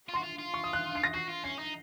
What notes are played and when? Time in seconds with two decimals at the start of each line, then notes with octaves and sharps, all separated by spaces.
0.09 F4
0.14 F#4 C6
0.23 F4
0.39 F4
0.54 C#6
0.64 D#6
0.73 F#6
0.95 C7
1.04 A#6
1.14 F#4 C7
1.29 F4
1.44 C#4 C7
1.59 D#4